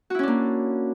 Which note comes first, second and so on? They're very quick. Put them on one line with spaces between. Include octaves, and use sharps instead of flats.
F#4 E4 C#4 D4 A#3